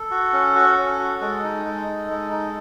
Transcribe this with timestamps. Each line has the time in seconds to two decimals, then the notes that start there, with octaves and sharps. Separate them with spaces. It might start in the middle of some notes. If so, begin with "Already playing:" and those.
Already playing: A4
0.11 F#4
0.33 C#4
0.55 F#4
0.77 C#4
0.99 F#4
1.21 G#3 A4
1.43 D#4
1.66 G#3
1.87 D#4
2.10 G#3
2.31 D#4